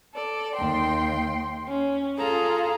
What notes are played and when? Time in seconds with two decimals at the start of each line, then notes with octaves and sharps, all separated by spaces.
0.12 A4 D5
0.55 D#2 G5 C6
1.67 C#4
2.17 F4 G#4 A4 A#5